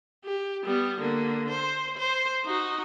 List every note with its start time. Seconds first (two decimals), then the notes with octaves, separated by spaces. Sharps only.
0.24 G4
0.64 G3 B3
1.00 D3 A#3
1.49 C5
1.97 C5
2.45 D#4 F#4